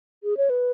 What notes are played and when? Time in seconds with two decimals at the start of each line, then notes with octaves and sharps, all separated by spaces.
0.24 G#4
0.37 C#5
0.50 B4